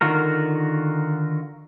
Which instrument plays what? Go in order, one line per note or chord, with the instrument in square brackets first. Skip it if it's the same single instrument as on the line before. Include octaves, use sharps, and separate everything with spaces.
[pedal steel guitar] D3 D#3 F4 F#4 A#4